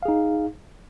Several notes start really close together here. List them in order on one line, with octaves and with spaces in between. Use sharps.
F5 G#4 D#4